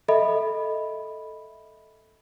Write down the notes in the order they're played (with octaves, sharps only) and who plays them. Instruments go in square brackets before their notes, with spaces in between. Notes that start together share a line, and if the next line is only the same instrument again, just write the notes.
[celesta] A4 D#5 E5 B5